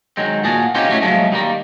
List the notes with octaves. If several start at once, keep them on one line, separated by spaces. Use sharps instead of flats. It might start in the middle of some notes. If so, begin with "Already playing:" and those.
D#3 F#3 G#3 C4
A#2 F#4 G#4 A5
C4 C#4 D#4 F4 G4 C#5
F#2 A2 F#3 A3 B3 C#4
A#2 F3 F#3 G#3 A3
D#3 G3 A#3